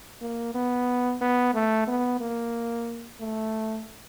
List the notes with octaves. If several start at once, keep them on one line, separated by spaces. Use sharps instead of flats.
A#3
B3
B3
A3
B3
A#3
A3